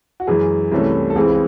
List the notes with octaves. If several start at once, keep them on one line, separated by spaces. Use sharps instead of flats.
F#4
F#2 E3 G#3 G#4
C2 C3 E3 A3 C#4
A4
C#2 C#3 E3 G#3 C4 G#4